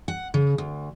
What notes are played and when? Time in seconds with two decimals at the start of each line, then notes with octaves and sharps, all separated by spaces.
0.08 F#5
0.34 C#3
0.58 D2